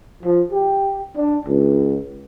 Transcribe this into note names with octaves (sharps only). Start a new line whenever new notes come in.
F3
G4
D4
C#2